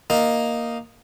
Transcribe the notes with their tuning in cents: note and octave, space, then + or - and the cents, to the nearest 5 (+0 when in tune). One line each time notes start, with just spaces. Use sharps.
A#3 +0 D#4 +0